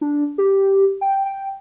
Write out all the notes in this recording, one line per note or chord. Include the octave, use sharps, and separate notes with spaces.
D4
G4
G5
G5